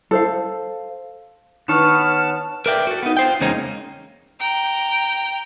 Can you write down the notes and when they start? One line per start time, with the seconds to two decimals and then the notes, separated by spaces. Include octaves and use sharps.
0.11 A4 C5 F5
1.68 D#3 B3 B4 C#5 A5 F6 E7
2.66 A#4 B4 D5 E5 G5
2.87 F#4 A4
3.03 B3 D#4
3.17 F4 C5 G5
3.40 E2 C#3 G#3 A#3 C#4 D#4
4.40 G5 A#5